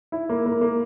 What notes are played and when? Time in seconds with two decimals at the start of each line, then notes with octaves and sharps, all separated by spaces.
0.12 E4
0.29 A#3
0.46 A#3
0.61 A#3